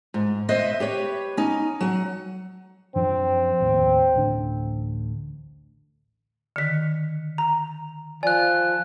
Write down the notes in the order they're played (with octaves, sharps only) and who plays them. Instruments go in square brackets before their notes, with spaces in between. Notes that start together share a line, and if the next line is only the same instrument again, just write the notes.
[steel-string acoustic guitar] G#2
B4 C5 D#5 E5 F#5
G4 B4 C#5
C#4 D#4
F#3 F#5
[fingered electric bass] F#2 F3 D4 [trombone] C4
[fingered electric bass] A1 D#2
A1 D2 D4
[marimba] D3 D#3 [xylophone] B6 C#7
[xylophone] A#5
[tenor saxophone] F3 [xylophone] D5 [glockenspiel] G#5 F#6